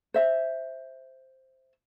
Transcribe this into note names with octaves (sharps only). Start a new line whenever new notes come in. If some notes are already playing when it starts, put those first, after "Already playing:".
C5 E5